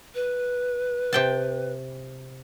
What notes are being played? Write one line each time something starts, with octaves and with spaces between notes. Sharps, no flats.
B4
C3 G5 A5